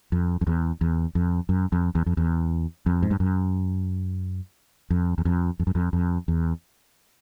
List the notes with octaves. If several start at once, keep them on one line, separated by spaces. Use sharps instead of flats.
F2
F2
E2
E2
F2
F#2
F2
E2
F2
E2
F2
G#2
G2
F#2
F2
E2
F2
F2
F#2
F2
F2
E2